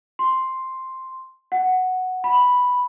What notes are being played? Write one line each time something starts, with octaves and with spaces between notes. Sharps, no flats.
C6
F#5
B5